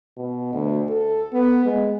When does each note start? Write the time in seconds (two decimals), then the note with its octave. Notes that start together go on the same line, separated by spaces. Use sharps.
0.17 B2
0.53 D2
0.89 A4
1.33 B3
1.65 G#3